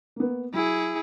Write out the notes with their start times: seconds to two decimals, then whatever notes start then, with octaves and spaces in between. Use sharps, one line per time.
0.16 A#3 B3
0.53 F#3 E4 G#4